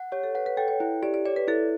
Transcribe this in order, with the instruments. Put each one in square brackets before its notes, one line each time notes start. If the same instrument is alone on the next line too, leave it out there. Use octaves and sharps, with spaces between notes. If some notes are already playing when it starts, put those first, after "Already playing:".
Already playing: [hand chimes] F#5
[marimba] G4 [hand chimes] C#5
[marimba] A4
[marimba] B4 [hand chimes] F#5
[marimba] B4
[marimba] A4 [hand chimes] G5
[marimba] C#5
[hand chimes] E4 [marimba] C#5
[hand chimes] G4 [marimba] D5
[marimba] D5
[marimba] C#5 [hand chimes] D5
[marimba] B4
[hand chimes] E4 [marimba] A4